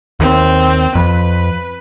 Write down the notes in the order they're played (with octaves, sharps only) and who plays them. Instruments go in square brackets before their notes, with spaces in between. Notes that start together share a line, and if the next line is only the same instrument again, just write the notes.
[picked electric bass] D#2 [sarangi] C4
[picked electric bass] F2 [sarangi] B4